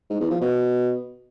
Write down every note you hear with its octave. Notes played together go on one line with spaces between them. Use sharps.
G#2
E2
F3
B2